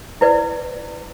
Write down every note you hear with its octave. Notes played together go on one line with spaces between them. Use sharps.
E4 B4 D5